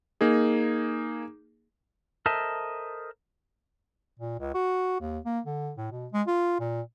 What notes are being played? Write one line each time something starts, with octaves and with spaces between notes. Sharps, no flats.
A#3 D#4 G#4
A4 A#4 C5 D#5 E5 A5
A#2
C#2
F#4
D#2
A#3
D3
A2
B2
G#3
F4
A#2